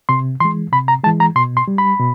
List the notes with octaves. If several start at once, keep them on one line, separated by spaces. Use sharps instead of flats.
C3 C6
E3 G#3 C6
C3 B5
A#5
E3 G#3 A5
A#5
B2 C6
C6
G3
B5
B2